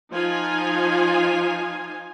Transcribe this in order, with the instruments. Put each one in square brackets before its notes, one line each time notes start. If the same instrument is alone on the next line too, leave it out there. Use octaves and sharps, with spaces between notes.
[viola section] F3 D#4 F4 G#5